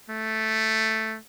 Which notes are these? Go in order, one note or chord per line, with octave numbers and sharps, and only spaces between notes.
A3